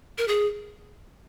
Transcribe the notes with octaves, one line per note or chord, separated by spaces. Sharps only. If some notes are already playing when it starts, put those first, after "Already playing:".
A#4
G#4